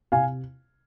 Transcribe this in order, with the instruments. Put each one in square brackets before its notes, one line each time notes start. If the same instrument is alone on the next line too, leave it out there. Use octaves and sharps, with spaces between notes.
[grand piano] C3 F5 G#5